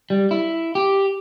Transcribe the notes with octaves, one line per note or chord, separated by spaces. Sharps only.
G3
E4
G4